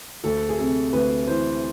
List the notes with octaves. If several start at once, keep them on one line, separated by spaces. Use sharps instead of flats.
D2 A4
G#4
C3 A4
D2 B4
E3 C5